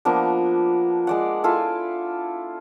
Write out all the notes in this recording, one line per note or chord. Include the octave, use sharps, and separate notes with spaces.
F3 A#3 B3 D4
G#3 D5 F#5
E4 F4 A4 G#5